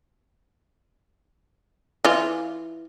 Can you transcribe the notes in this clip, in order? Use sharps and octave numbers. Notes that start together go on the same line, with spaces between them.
E3 F4